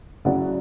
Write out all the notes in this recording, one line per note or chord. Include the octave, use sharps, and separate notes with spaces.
C#3 F#3 C#4 E4 D5 F#5